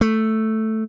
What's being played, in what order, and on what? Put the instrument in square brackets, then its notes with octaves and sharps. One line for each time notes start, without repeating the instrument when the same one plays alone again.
[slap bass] A3